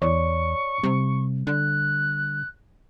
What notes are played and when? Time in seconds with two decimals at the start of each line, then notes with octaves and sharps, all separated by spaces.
0.02 E2 C#5 D5 C#6
0.84 C3 G3
1.47 D3 F#6